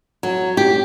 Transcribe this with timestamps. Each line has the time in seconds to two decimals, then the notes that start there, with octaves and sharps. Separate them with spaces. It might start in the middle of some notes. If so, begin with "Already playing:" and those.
0.23 F#3
0.57 G4